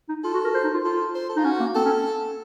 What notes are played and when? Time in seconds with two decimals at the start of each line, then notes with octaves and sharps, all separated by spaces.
0.09 D#4
0.24 F4 A4
0.34 F#4
0.44 A#4
0.54 C5
0.64 D#4
0.74 F4
0.84 F4 A4
1.15 C5
1.29 A4
1.36 D#4 F4
1.44 C#4 F#4
1.60 A#3
1.75 C4 A4
1.85 C#4